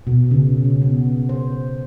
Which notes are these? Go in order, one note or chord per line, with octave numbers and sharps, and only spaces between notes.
B2
C#3
C#4
B3
C5